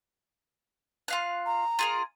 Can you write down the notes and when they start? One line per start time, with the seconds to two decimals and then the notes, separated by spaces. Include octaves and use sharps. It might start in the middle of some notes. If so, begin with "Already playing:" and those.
1.08 F4 F5 F#6
1.46 A#5
1.79 F4 G#4 A#4